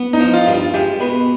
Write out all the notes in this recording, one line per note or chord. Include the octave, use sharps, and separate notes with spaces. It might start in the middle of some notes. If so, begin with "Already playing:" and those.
Already playing: B3
D#4
F3
F4
G2
F4
G#3 G4
B2 B4